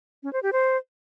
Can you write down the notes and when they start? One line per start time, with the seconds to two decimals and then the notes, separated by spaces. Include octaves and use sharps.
0.23 C#4
0.33 C5
0.43 G4
0.53 C5